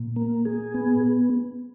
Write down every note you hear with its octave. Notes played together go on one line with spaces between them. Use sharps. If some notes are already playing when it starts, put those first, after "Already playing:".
Already playing: A#2
A#3
G#4
B3